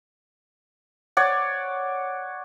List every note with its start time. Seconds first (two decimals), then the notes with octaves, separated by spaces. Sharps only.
1.17 C#5 D5 F#5